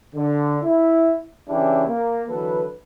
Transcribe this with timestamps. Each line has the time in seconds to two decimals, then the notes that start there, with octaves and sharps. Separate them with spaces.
0.15 D3
0.63 E4
1.48 C#3 E3 C#4 D4 E4 G4
1.88 A#3
2.28 D3 E3 F#3 A4 B4